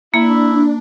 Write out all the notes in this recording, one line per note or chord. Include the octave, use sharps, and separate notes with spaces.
A#3 D4 E4